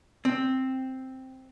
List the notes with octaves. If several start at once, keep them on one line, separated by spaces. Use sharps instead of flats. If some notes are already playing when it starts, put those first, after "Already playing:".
C4